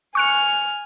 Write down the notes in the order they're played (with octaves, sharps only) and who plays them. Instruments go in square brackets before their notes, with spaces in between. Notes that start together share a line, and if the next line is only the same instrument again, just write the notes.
[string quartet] G#5 F6 [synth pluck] C#6 F#6 C#7